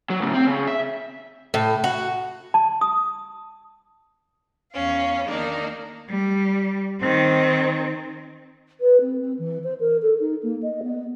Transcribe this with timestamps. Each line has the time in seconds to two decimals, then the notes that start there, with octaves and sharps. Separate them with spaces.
0.10 F#3
0.22 A2 C#3
0.34 C4
0.47 C#3
0.67 E5
1.54 A2
1.84 F#4
2.54 A5
2.81 D#6
4.72 E2 C#4 F5
5.26 D#3 A#3 D4 D#4
6.09 G3
7.01 D#3 C4
8.81 B4
9.01 C4
9.21 C4
9.39 E3
9.64 C5
9.80 A#4
10.02 A4
10.20 D#4
10.43 A#3
10.63 D#5
10.83 B3